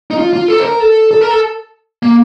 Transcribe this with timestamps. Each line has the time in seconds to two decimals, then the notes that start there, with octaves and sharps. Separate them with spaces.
0.11 D#4
0.18 F4
0.33 F4
0.48 A4
0.60 C5
0.64 A#4
0.80 A4
1.11 A4
1.21 A#4
1.31 A4
2.03 A#3